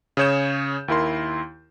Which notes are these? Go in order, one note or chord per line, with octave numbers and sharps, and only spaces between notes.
C#3 G#4 C#5 G6 E7
D#2 E4 A#4 C6